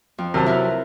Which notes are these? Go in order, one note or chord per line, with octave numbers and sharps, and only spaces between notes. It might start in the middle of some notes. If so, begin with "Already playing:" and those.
F2
C3 F#3 A#4 A5
E4 A#4 B4